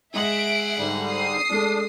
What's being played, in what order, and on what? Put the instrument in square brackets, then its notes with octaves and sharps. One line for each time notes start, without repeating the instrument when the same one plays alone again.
[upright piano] G#3 D#5 F#7 [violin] G#4 F#5 [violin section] E5 D7
[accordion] G#2 D3 G3
[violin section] D#6 C7
[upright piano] G#3 A3 [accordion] D4